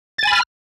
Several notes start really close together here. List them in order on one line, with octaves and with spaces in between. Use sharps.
A6 G#5 B5 F6